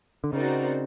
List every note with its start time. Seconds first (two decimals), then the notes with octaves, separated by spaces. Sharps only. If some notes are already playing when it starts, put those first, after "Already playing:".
0.24 D3
0.33 C#3 C4 D#4 F#4 A#4 D5